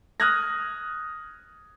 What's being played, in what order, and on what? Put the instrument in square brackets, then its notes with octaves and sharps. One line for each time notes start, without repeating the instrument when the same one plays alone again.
[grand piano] D#6 F6 F#6 G#6 A#6